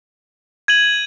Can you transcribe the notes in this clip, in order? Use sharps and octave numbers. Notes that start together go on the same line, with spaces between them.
G#6 D#7 F#7